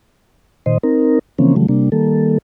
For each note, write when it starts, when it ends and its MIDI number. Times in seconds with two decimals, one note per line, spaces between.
0.66 0.78 46
0.66 0.78 51
0.66 0.78 72
0.66 0.78 75
0.83 1.19 60
0.83 1.19 63
0.83 1.19 70
1.39 1.55 49
1.39 1.55 52
1.39 1.55 53
1.39 1.55 58
1.39 1.55 60
1.39 1.55 61
1.56 1.67 49
1.56 1.67 52
1.56 1.67 54
1.56 1.67 55
1.56 1.67 57
1.69 1.90 48
1.69 1.90 55
1.69 1.90 58
1.69 1.90 62
1.92 2.38 51
1.92 2.38 55
1.92 2.38 58
1.92 2.38 69